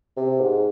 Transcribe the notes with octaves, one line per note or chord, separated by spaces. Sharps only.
C3
G#2